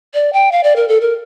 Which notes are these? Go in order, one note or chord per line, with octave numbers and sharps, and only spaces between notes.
D5
G5
F5
D5
A#4
A4
A#4